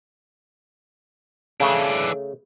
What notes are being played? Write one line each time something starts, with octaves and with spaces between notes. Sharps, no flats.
C#3 E3 A3 D4